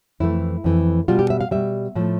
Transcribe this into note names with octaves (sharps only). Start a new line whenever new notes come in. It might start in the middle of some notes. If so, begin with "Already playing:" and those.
F2 E3 A3 E4
F2 E3 A3
B2 G3 F4
G4
E5
F5
B2 G3 E5
A2 F3 A3